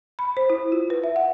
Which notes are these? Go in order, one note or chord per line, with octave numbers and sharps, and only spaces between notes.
B5
C5
E4
F4
B4
E5
F#5